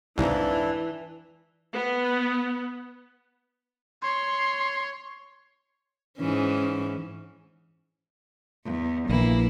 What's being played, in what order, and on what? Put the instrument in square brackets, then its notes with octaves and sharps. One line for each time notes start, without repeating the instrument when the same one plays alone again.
[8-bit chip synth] C2 [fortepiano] F2 G#2 [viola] E3 [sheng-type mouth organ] D4 E4
[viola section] B3
[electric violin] C#5 [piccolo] C6
[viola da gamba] G#2 E3 C#4
[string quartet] E2
[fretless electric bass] A#1 E3 [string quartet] A#3 E4